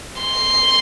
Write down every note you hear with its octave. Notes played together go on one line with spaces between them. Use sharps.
C6